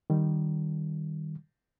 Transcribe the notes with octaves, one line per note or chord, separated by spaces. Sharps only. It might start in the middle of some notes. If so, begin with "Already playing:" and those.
D#3 G3